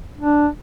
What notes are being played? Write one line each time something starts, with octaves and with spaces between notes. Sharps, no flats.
D4